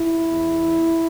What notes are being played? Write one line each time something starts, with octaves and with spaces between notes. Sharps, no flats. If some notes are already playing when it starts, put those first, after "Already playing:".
Already playing: E4
E2